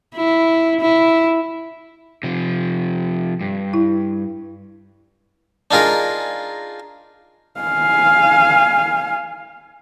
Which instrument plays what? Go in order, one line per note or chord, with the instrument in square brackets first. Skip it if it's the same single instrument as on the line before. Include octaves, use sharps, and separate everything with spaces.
[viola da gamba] E4
E4
[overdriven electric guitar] C3 F3
G2
[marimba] E4
[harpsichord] D4 D#4 F4 G#4 A#4
[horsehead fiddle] F5 G#5